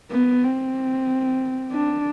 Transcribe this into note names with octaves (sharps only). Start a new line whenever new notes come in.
B3
C4
D4